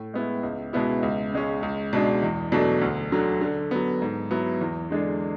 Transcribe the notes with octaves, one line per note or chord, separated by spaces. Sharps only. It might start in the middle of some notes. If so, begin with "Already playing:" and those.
Already playing: A2
G#3 B3 E4
C#2
B2 G#3 B3 E4
C#2
C#3 G#3 C#4
C#2
B2 G#3 D4
E2
B2 F#3 A3 D4
D2
D3 F#3
D3
F#3 B3
G#2
F#3 B3 E4
E2
D3 G#3 D4